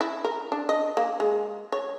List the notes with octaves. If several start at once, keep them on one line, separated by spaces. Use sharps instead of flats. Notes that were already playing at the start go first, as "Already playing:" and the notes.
E4
A#4
D4
D#5
A#3
G#3
C#5